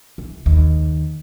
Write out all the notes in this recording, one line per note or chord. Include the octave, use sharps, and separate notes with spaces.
C2
D#2